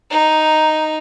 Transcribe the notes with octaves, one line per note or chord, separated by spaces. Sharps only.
D#4